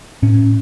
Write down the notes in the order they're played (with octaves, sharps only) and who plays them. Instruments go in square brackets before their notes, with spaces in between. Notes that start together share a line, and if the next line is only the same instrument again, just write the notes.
[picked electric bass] A2 C#4